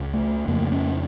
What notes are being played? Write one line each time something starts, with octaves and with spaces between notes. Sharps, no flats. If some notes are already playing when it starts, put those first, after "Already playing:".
Already playing: C#2 C#3
A3
F2 C#3 A#3
C#4